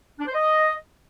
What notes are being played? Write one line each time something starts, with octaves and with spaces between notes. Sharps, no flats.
D4
C5
D#5